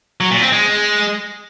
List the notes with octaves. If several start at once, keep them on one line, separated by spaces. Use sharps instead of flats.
F#3
A#2
C4
G#3